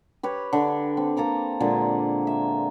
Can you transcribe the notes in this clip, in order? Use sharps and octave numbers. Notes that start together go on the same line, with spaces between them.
G4 B4 C#5
D3
C4
A#3 A4 A#5 D6
A#2 D3 G#3
E5